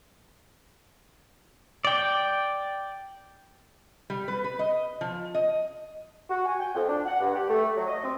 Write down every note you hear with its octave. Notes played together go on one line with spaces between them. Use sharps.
D5 G5
G3
B4
B4
D#5
F3
D#5
F#4
G#5
G5
F2
D4
F#5
G2
G4
A3
F#3
D#5
C4